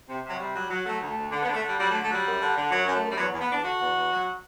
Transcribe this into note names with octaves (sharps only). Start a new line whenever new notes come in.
C3
C3
F#3
C3 G3
F#3
F#3
F#3 A3
D2
A3
D2
D3
B3
D3
A3
D3 G3
F#3 G3
A3
D3
A3
F#3 G3
F#2
D3
D3
F#2 F#3
F#2
A3
F#2
G3
E2 F#3
E2
B3
E2 D4
D3 F#4
E2
E2
F#3